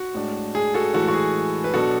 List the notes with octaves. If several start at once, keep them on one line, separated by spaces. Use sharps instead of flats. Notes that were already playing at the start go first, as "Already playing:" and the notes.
Already playing: F#4
A2 G#3 D4
G#4
F#4 A4
A2 E3 G#3 F#4 A4
F#4
G#4
B4
B2 F#3 B3 D4 F#4 A4